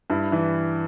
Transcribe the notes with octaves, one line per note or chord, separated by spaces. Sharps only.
G2 E4
E3